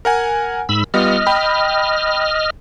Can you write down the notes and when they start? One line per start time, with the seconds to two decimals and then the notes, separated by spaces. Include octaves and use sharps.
0.05 A#4 F#5 G#5
0.69 G#2 B5 E6
0.94 G3 B3 F4 D#5 F6
1.27 G5 B5